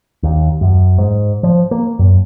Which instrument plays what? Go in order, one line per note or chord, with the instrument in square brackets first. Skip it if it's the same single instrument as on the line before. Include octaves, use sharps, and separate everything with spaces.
[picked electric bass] D#2
F#2
G#2
F3
A#3
F#2